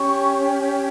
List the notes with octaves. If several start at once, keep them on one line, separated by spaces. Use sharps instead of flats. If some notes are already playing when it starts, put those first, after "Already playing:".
Already playing: C#4 G4 C#5 C#6